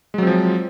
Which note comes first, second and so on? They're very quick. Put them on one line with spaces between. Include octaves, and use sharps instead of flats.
G#3 F#3 C4 F3